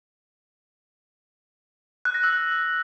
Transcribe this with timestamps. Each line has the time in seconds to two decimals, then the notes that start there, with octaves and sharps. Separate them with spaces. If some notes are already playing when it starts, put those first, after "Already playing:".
2.05 F#6
2.14 A#6
2.24 E6
2.33 F#6